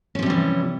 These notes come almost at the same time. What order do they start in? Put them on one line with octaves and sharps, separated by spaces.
C#4 F3 C3 G3 E3